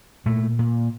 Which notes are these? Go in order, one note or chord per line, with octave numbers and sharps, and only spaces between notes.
A#2 A3
A#2